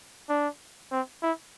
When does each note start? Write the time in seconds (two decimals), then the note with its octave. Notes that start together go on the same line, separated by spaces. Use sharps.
0.29 D4
0.92 C4
1.23 E4